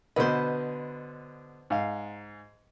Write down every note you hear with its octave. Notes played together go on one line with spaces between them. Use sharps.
B2 D3 B4 C5 D#5
G#2 F5